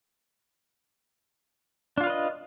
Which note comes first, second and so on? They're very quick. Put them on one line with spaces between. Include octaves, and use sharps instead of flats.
D4 F4 F5 B4 D#5